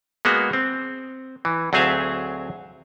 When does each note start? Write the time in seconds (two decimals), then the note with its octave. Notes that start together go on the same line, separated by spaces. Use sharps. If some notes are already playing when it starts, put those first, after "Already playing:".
0.25 G#3 A#3 B3 F#4
0.53 C4
1.45 E3
1.73 D2 F#3 C4 G#4 E5 F5